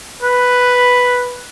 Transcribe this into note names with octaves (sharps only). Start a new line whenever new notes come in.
B4